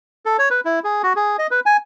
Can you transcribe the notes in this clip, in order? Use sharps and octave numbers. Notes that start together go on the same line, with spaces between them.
A4
C#5
B4
E4
G#4
F#4
G#4
D#5
B4
G#5